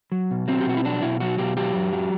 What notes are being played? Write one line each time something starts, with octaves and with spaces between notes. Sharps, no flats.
F#3
B2
F#3 C4
G4
B2 F#4
E4
F#3 D4
B2 E4
F#3 F#4
B2 G4
F#3 G4
F#2
F#3